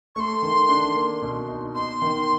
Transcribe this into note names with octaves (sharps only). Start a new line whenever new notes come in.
A3 C6 C#6
D#3
D4
A#3
B2
D#4
B3 C6
D#3